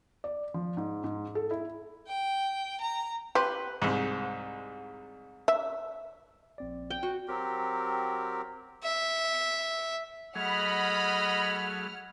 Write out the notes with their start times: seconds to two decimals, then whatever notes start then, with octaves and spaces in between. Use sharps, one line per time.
0.24 D5
0.54 F3
0.77 G#2
1.04 G#2
1.35 A4
1.51 E4
2.08 G5
2.81 A#5
3.35 G4 B4 C6
3.82 C2 G#2
5.48 E5
6.58 A#1 C4 D5
6.90 G5
7.03 F#4
7.28 F#3 C4 G4 A#4
8.83 E5
10.35 F#3 A3 G#4 D#5 F#5 B5 F6